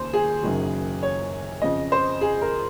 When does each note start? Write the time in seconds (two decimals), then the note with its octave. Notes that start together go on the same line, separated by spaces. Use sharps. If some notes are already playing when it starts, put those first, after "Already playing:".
Already playing: D#2 C#3 C5
0.13 G#4
0.43 F#1 F#2 D#3 F#3
1.03 C#5
1.62 F2 C#3 F3 D#5
1.92 C5
2.21 G#4
2.42 A#4